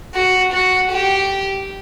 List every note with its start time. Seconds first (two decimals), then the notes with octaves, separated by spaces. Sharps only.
0.14 F#4
0.53 F#4
0.91 G4